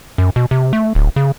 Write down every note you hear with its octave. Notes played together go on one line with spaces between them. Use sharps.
F#2
B2
C3
A3
D1
C#3